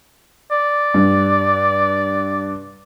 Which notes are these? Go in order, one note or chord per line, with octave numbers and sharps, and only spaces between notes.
D5
G2